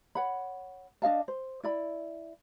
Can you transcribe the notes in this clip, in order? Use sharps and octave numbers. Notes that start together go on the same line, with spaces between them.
C#5 F#5 B5
D4 D#5 F5 A5
C5
E4 D5 B5